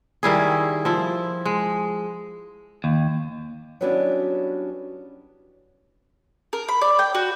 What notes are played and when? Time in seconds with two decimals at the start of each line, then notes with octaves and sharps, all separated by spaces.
0.23 D#3 G3 E4 G#4
0.85 F3 E4
1.46 G#3
2.84 D#2
3.81 F#3 G3 B3 C#4 D4 E4
6.53 A#4
6.68 B5
6.81 D5
6.99 G5
7.15 F#4